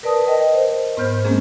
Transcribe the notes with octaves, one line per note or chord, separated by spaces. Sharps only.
A#4 B4 D5 A5 D#6
A#4 D#5 G5
C5
G#2 B3 C5 F6 G6
G#3 A#3 C4 C#4 G#4